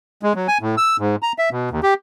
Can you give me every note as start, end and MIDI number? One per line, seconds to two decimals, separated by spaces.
0.23 0.33 56
0.35 0.47 54
0.48 0.58 80
0.61 0.75 45
0.77 0.97 88
0.99 1.16 44
1.23 1.32 82
1.38 1.49 76
1.51 1.69 47
1.71 1.80 39
1.83 1.94 67